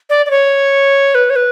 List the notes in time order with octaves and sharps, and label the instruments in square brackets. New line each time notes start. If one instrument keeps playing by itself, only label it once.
[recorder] D5
D5
C#5
B4
C#5
B4